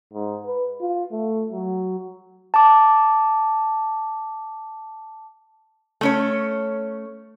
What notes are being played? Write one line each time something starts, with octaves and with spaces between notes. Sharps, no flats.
G#2
B4
F4
A3
F#3
A5 D6
A3 C#4 C#5